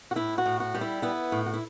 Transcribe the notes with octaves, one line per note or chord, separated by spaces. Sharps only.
F#4
A2 E4
F#4
A2
F#4
G3
E4
B3 E4
A2
F#4
E4